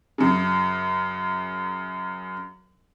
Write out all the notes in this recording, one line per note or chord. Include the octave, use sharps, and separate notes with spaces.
F#2 C#3